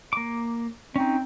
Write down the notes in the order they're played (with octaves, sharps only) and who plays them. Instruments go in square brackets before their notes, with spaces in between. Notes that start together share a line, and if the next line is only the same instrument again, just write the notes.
[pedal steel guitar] A#3 D6
[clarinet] C4 [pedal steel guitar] C#4 D#4